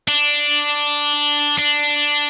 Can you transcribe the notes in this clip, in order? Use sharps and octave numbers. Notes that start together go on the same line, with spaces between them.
D4
D4